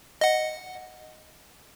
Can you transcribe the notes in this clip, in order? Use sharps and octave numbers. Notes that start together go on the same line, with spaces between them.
D#5 F#5